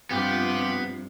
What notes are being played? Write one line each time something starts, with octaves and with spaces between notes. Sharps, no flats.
G2 C3 F3 B3 F4 G4